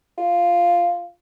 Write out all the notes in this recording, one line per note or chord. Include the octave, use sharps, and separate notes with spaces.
F4